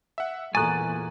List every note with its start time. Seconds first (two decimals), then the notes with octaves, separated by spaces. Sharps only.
0.18 E5 F#5
0.55 E2 A#2 A4 G#5 A#5 C#6 F#6 A6